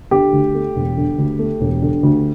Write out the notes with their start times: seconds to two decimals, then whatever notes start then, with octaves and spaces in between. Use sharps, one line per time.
0.11 D3 G4
0.33 D2
0.54 A3
0.76 E1
0.97 D3
1.18 D2
1.39 A3
1.61 E1
1.82 D3
2.03 D2